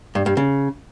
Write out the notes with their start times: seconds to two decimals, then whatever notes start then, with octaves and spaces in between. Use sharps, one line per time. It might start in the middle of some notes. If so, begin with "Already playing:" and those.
0.15 G2
0.26 G2
0.37 C#3